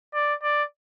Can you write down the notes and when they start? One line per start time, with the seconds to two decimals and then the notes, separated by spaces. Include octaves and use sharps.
0.14 D5
0.43 D5